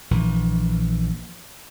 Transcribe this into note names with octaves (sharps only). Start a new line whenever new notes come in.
A#1 E3